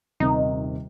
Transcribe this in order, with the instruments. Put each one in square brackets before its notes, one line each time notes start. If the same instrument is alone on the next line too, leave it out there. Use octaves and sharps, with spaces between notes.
[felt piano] D#1 C3 D#3 [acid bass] D#4